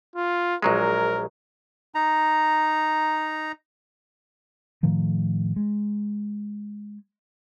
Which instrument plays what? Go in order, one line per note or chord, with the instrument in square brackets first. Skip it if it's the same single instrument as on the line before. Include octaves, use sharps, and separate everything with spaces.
[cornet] F4
[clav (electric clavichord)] A#1 F#3 G#3 [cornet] A#4
[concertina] D#4 A#5
[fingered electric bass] A2 D#3 F3 A3
G#3